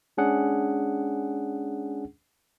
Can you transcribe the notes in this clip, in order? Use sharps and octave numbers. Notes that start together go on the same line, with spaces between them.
G#3 C#4 D4 G#4 F#5